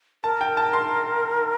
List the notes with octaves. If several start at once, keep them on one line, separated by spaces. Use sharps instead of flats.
A#4 A5
G5
A5
C6